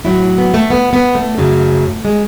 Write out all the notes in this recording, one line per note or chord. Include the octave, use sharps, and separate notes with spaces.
A2 F#3 E4
B3
A3
B3
B3
A3
F#2 C#3 F#3
G#3